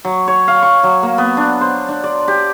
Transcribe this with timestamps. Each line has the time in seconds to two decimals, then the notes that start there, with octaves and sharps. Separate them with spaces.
0.05 F#3
0.28 C#5
0.48 F5
0.63 C#6
0.83 F#3
1.03 A#3
1.18 B3
1.37 D4
1.61 C5
1.88 D4
2.04 D5
2.28 G4